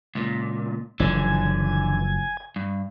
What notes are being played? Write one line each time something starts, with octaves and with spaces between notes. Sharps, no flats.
C#2 A#2
F#1 D3 E3 F3 G#5
G2